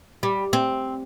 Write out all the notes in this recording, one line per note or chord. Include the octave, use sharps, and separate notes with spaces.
G3
C4